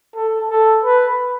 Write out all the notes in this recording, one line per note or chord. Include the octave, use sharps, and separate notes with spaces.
A4
A4
B4